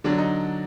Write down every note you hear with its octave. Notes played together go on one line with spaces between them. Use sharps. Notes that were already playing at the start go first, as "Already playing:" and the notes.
D3 F#3 D4
D#4